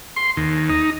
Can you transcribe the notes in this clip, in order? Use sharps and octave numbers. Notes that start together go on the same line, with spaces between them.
C6
D#2
D#4